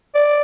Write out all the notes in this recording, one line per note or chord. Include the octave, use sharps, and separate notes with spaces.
D5